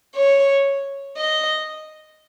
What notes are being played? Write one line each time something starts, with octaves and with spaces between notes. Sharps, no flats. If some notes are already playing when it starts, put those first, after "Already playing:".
C#5
D#5